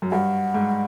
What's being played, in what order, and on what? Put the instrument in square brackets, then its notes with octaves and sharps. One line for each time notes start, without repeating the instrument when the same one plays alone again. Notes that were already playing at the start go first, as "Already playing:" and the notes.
[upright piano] F#2
[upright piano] G2 [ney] F#5
[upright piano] G#2